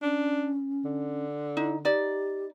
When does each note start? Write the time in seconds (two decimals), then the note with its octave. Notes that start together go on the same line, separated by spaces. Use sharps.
0.02 C#4 D4
0.85 D3
1.57 D#4 E4
1.85 D#4 G4 D5